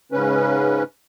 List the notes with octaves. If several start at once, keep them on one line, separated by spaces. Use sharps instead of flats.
G#2 C#3 C#4 B4